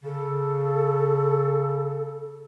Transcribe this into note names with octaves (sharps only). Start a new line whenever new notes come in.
C#3 A4